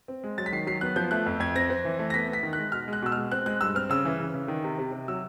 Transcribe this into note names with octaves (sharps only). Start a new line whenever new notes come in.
C4
G#3
F#3 A6
B6
D#3 C7
F#3 C7
B3 F#6
F3 G6
A3 F#6
F2
F2 G#6
C4 A#6
C4
E3
A3
A#6
B3 B6
B3
B6
D#3
F#6
G#3
B2 F6
G#3 F#6
B2 E6
F6
G#3
C4 F#6
G#3 F#6
G2 E6
C4 F6
C#3 E6
E3
C#3
C#3
D#3
C3
C3
C3
F#3 E6